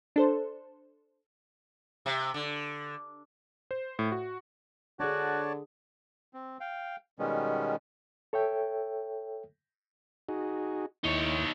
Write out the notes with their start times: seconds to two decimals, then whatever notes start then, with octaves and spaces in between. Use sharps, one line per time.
0.16 D4 A4 C5
2.06 C3
2.34 D3
3.71 C5
3.99 A2
4.12 F#4
5.00 D3 D4 F#4 G#4 C#5 D5 A5
6.33 C4
6.60 F5 G5
7.19 B2 D#3 G3 G#3 B3 C#4
8.33 A4 C#5 E5 G5
10.29 D#4 F#4 G#4
11.04 D#2 D#4 E4 C#5